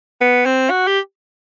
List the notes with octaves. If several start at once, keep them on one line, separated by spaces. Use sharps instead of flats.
B3
C4
F#4
G4